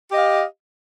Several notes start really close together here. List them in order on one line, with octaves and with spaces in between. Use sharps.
G4 D#5 F5